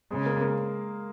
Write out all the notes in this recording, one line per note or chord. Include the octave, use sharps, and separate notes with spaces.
C#3 G#3
A#3
A#3